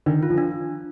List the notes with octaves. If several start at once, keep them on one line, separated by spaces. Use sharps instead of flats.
D#3 D4
F4
F3
D4